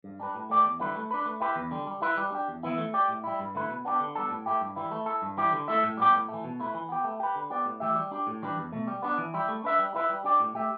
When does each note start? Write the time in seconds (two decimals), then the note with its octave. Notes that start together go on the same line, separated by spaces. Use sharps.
0.04 G2
0.20 G3 D4 B4
0.35 A2
0.50 A3 G4 D5
0.65 E2
0.80 D3 G3 E4 B4
0.96 A3
1.11 D4 B4
1.26 A3
1.41 E4 G4 B4
1.56 E2
1.71 D3 G3
1.87 G3
2.02 E4 B4
2.17 G3
2.32 D4 G4
2.48 E2
2.63 E3 B3 E4
2.78 A3
2.94 G4 D5
3.08 A2
3.24 G3 E4
3.39 G2
3.55 D3 A3 E4 B4
3.69 B2
3.85 B3 D4 G4
4.00 D3
4.15 G3 B3 D4 A4
4.30 A2
4.46 A3 E4 G4
4.61 G2
4.76 E3 G3 E4
4.92 A3
5.06 E4 A4
5.22 G2
5.37 E3 G3 E4 G4
5.53 D3
5.68 A3 E4 A4 E5
5.83 A2
5.97 G3 B3 G4
6.13 A2
6.28 A3
6.33 E3
6.44 B2
6.60 A3 E4 B4
6.74 E3
6.89 B3 G4
7.04 A3
7.20 G4 B4
7.35 D3
7.50 B3 G4 D5
7.65 A2
7.80 E3 A3 G4 E5
7.96 G3
8.11 D4 G4
8.27 A2
8.42 E3 G3 D4 B4
8.58 E2
8.72 B2 A3
8.87 G3
9.02 B3 D4
9.18 E3
9.34 G3 E4 G4
9.48 A3
9.64 D4 B4 E5
9.79 G3
9.94 E4 B4 E5
10.09 G3
10.24 D4 G4 D5
10.40 A2
10.55 A3 G4 E5